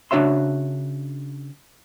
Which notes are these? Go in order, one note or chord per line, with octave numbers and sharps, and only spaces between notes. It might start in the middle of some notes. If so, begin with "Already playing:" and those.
C#3 D4 F#4 C#5 E5 C6